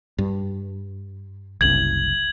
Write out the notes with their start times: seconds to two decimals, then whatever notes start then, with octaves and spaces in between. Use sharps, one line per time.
0.18 G2
1.61 F#1 C2 G#6 F#7